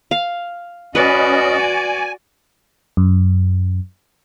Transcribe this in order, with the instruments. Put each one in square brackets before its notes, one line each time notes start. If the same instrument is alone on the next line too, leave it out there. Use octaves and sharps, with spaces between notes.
[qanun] F5
[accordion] C#4 D#5 [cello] F#4 D5 [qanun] B4
[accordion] G#5
[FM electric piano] F#2